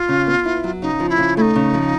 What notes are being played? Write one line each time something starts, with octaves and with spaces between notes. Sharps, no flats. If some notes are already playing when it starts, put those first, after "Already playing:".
Already playing: F4
C#3
B3
E4
F#3
C#3 D#4
F3
E4
C#3
A3 D#4 E4
C#3
F3